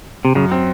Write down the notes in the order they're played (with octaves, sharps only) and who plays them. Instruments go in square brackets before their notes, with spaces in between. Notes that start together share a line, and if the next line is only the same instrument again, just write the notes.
[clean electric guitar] C3
[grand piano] F#2 [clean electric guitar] C#3
[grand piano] C4